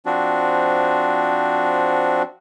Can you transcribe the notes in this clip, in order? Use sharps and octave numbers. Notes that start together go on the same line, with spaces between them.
F3 C4 D4 F#4